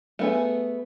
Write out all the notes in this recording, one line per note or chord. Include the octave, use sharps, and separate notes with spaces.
A3 B3 G#4